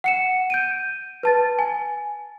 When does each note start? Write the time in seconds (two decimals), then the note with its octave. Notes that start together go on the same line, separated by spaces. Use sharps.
0.04 F#5 C#7 E7
0.50 G6 D7 D#7
1.23 B4 A5 A6
1.59 G#5